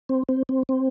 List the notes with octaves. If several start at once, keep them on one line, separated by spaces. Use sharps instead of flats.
C4
C4
C4
C4